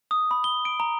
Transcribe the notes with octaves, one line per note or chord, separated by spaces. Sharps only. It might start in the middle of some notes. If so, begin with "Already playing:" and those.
D#6
B5
G7
D7
A#5